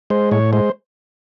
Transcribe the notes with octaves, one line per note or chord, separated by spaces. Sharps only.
G#3 C5
A2 C#5
G#3 C5